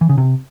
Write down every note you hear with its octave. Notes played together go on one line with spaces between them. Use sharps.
E3
C#3
C3